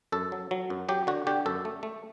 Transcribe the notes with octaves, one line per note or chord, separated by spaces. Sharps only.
F#2 A4
F#3
F#3
F#2
F#3 G4
D3 F#4
D3 G4
F#2 A4
A3
A3